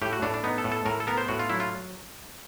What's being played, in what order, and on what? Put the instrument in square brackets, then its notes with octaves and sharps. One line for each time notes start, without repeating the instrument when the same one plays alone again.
[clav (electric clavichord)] A2 G4
F#4
A2 D4
D4
B3 D#4
A4
A2
A4
A2 A#4
A4
B3 A#4
C5
A2 F#4
F4
F#3 E4
F4